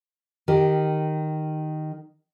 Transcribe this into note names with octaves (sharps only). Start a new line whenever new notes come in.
D#3 G4